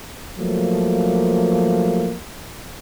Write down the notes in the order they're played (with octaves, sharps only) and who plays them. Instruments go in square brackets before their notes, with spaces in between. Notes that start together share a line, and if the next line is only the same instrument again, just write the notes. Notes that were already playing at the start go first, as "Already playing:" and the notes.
[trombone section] F3 F#3 A3 A#3